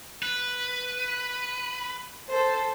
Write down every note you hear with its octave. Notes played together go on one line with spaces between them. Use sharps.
B4
A4 C5